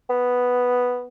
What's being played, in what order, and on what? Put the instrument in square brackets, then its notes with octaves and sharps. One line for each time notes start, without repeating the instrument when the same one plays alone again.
[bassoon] B3